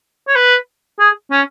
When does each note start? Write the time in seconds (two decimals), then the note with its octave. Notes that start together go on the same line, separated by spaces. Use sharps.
0.28 C#5
0.36 B4
1.00 G#4
1.31 C#4